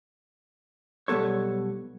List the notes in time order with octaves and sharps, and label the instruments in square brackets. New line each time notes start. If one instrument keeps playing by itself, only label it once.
[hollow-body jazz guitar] B1 G3 B3 A4 C#5